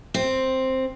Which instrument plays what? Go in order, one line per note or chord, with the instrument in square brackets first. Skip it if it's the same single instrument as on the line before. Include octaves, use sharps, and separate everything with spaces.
[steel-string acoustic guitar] C4